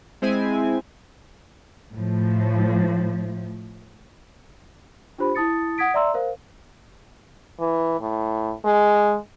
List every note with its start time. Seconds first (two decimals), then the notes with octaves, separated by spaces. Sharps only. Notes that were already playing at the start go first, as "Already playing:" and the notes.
0.22 G#3 C4 E4 G#5
1.94 A2 F3
5.18 D4 F4 G4 C5 B5
5.35 E4 A5 D#6 A6 C#7
5.78 F#5 D#6 G#6 B6 D7
5.94 D5 E5 A#5 C6 E6
6.14 A#4 C5 F5
7.59 E3
8.00 A2
8.65 G#3